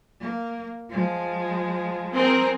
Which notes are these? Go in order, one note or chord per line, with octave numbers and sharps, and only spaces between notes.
A#3
F3 G#3
C4 G#4 A#4